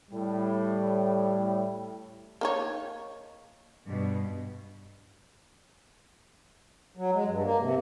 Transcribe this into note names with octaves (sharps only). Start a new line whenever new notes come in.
A2 G3
A#3 D#4 C#5
G2 B2
F#3
G#3
G2
A#3
C3